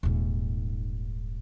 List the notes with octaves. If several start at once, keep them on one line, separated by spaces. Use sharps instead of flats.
D#1 G#2